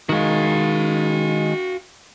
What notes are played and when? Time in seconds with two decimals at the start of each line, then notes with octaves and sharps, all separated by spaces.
0.09 D#3 G#3 F#4 F5